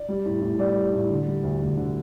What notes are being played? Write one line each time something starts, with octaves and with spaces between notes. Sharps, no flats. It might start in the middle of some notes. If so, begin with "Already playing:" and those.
Already playing: D5
G3
A2
A2
G3 D5
G3
A2
D3
G3
D2
D2
D3